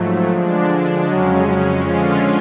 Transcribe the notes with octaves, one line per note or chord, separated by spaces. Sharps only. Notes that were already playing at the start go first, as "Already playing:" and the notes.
Already playing: G#2 F3 F#3 A3
D3 G#3 D4
F2 C#3 F#3 G#3 C#4
F#3
D3 F3 G#3 C#4 F4